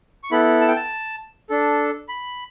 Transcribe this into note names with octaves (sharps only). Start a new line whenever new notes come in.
C#6
B3 E4 A4 B5
A5
G5
A5
D4 A4
B5